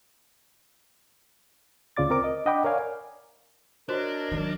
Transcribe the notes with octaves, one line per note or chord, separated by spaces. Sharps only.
D2 C#3 F4 D5 D6 A6
C4 A#4 D6
D#5
D4 D#5 F#5 G5 B5 D6
A#4 C#5 D5 F5 G#5
D4 F#4 A#4 C5 C#5 D#5
D#3 F#3